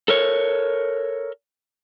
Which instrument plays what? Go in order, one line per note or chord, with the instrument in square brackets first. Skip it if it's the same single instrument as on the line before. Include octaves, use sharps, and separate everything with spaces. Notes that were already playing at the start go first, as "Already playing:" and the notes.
[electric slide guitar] A4 A#4 C#5